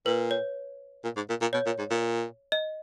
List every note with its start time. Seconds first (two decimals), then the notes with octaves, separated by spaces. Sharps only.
0.06 A#2 B4
0.31 C#5
1.04 A#2
1.16 G#2
1.29 A#2
1.41 A#2
1.53 B2 C#5
1.66 A#2
1.79 G#2
1.90 A#2
2.52 D#5